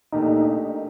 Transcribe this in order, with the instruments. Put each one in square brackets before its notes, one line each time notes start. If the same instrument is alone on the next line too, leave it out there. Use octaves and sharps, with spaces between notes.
[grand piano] A#2 A3 D4 G4 A#4 [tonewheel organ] D#4